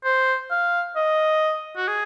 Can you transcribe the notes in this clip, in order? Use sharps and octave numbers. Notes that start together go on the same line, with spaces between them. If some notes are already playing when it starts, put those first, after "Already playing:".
C5
F5
D#5
F#4
G#4